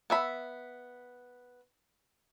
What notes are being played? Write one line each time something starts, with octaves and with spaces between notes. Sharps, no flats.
B3 E5 B5